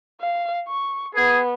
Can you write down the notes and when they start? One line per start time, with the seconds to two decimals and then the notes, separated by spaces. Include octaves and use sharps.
0.21 F5
0.68 C#6
1.15 B3 G#4